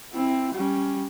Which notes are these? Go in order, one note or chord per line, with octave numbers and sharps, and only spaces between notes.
C4 E4
G3 C#4